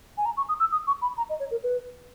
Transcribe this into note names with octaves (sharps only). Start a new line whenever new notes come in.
G#5
A#5
C#6
D#6
E6
D#6
C#6
B5
A#5
D#5
C#5
A#4
B4